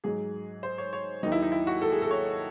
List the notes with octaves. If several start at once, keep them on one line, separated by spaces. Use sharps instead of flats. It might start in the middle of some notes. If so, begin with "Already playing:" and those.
G#2 F#3 G#4
C5
C#5
C#5
D#2 D#3 F#3 D#4
E4
D#4
E4
F#4
A4
G#4
A4
C#5